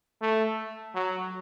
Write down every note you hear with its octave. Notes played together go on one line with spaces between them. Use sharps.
A3
F#3